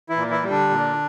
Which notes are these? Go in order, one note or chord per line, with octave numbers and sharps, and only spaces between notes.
E3 E4
A#2
E3 E4
G3
D3 D4
A#2